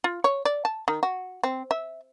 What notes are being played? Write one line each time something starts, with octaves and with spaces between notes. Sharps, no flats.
F4
C#5
D5
A5
D#3
F#4
C4
E5